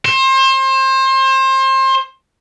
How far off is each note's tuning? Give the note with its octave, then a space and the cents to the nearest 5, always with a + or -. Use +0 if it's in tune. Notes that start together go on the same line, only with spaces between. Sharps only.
C5 +30